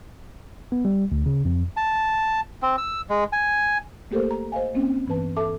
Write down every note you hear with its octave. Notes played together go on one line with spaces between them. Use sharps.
B3
G3
D2
C#3
F2
A5
C4
E6
G#3
G#5
A3 A#3 G4 A4 A#4 C5
A#5
C5 D#5 F5 G#5
A#3 C4 C#4
G2 E3 B3 B4 A5
A4 E5 A5 D6